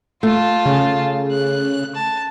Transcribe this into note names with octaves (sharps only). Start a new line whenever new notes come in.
A3 F4 A5
C#3
F#6
A5